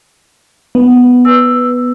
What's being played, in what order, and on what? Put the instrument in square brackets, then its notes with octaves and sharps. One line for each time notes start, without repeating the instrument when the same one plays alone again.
[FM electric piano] B3
[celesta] B4 E6